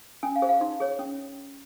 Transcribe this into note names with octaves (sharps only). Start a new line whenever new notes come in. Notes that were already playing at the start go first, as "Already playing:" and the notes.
C#4 G#5
F5
G#4 C5
F5
D#4 C6
G#4 C#5
C#4